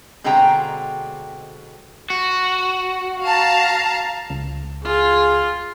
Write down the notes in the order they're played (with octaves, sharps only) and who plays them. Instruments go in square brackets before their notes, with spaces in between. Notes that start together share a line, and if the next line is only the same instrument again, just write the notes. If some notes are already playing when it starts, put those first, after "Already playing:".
[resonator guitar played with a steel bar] B2 D3 G#3 C4 G5 A#5
[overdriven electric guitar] F#4
[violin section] F5 A5 A#5
[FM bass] C#2
[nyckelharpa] F4 [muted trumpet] G#4